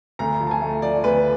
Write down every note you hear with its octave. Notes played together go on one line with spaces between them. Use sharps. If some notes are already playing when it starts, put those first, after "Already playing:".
D2 A#5
F3
A5
G#5
A3
F3 D5
D2 B4